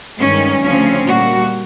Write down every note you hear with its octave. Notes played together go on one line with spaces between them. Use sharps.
G2 D#3 G#3 C#4
D2 C#3 F3 A3 C4 C#4
A#2 G3 A#3 F#4